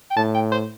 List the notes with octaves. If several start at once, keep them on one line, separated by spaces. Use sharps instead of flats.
G5
A2 A5
G5
C5